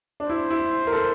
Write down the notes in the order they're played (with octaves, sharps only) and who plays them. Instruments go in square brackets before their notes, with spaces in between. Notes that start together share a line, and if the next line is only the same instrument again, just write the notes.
[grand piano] D4
[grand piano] E4 [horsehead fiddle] C5
[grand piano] E4
A#4
A4